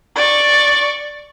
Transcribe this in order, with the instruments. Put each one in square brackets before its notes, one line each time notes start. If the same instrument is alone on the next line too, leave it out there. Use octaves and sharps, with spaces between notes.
[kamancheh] D5 C#6